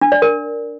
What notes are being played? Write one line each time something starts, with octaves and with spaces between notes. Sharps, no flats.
D4
D5
A#4